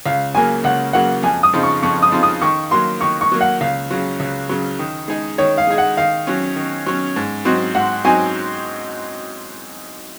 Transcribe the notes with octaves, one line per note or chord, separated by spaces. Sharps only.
C#2 F5
C#3 F#3 A#3 G#5
C#2 F#5
C#3 F#3 A#3 F#5
F2 G#5
D#6
C#3 F3 C4 D#4
C#6
F2 C#6
D#6
C#3 F3 C4 D#4
D#6
D#3 C#6
F#3 A#3 C6
D#3 C#6
C#6
F#3 A#3
F#5
C#2 F5
C#3 F#3
C#2
C#3 F#3
D#3
G#3 D#4 G#4
D#3 C#5
F5
G#3 D#4 G#4
F#5
D#3 F5
F#3 C#4
D#3
F#3 C#4
G#2
F#3 C4 D#4 F#4
G#2 F#5
F#3 C4 D#4 F#4 G#5